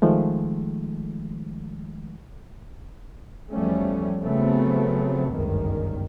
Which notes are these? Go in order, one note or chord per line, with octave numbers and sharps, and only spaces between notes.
D#3 F3 G#3 A3
E2 F3 G3 A3 C#4
C#3 F3 F#3 A3 B3 C4
G1 C#2 F#2 D#3